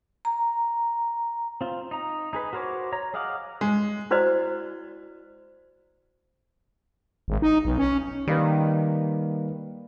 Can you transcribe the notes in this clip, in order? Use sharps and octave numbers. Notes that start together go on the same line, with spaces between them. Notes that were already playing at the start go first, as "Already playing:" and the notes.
A#5
C4 F4
D#4 A#5
D#4 G#4 B4
F#4 A#4 C5 C#5 D6
C#5 A#5
G#4 D#5 F5 F#5 D6
G#3
E4 F#4 B4 C5 D5 D#5
G#1
D#4
B1
C#4
D#3 G3 A#3 B4